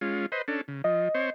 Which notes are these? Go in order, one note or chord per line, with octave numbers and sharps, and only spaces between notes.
G#3 C#4 F4
B4 C5 D#5
C#4 D4 A4
C#3
F3 D#5
C4 C5 C#5